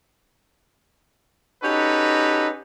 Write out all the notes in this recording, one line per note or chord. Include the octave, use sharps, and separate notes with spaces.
C#4 D#4 F#4 G4 A4 B4